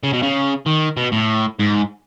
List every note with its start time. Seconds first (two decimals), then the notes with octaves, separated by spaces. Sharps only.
0.03 C#3
0.13 B2
0.22 C#3
0.66 D#3
0.97 B2
1.12 A2
1.59 G#2